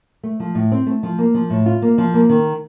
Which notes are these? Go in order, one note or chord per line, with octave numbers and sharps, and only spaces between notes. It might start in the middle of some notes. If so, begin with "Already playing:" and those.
A3
F3
A2
C4
A3
F3
A#3
F3
A2
F4
A#3
F3
A#3
D#3